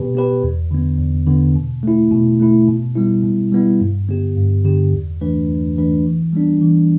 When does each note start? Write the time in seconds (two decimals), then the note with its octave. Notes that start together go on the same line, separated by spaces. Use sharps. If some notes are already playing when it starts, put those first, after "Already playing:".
Already playing: B2 B3 G4 B4
0.15 B3 G4 B4
0.43 E2
0.71 D3 B3
0.98 E2
1.27 D3 B3
1.55 B2
1.83 A3 E4
2.11 B2
2.40 A3 E4
2.68 B2
2.95 G3 B3 E4
3.23 B2
3.52 G3 B3 E4
3.81 G2
4.08 D3 B3 G4
4.36 G2
4.65 D3 B3 G4
4.93 E2
5.21 E3 A3 D4 B4
5.48 E2
5.76 E3 A3 D4 B4
6.05 E3
6.33 G3 B3 D4
6.61 E3